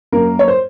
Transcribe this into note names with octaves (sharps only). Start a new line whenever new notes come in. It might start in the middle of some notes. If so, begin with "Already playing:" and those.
F#2 A#3 A#4
C#5
C5